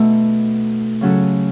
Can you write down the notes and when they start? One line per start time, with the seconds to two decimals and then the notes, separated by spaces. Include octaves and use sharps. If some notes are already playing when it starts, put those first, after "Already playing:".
Already playing: B2 A3 D#4 A4
1.01 C#3 F#3 C#4 F#4 A4